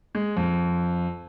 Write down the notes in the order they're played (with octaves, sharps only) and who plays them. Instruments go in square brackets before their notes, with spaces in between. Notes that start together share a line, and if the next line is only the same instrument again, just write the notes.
[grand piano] G#3
F2